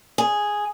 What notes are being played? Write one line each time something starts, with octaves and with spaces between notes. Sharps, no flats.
G#4